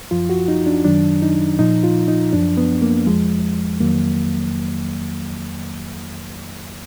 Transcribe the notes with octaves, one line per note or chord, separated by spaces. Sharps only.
F#2 F3 F4
F#4
D#4
D4
F#2 D#3 F#3 D4
D#4
A#2 F3 D#4
F4
D#4
F#2 F3 D4
B3
A#3
F2 F3 G#3
F2 D#3 F#3 A#3